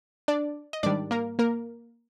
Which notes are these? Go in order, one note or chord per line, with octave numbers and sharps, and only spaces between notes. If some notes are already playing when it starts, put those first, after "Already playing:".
D4 D5
D#5
G#2 D#3 G3 D4 D5
A#3 A#4
A#3 A#4